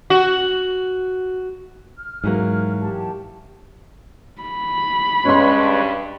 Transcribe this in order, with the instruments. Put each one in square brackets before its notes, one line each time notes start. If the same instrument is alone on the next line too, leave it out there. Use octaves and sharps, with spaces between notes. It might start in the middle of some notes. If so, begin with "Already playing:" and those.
[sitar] F#4
[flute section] F6
[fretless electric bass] G#2 [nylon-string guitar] E3 F#3 A#3
[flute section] G4 A5
[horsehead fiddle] B5
[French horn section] G2 [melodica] G#3 B4 C#5 [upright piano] C#4 C6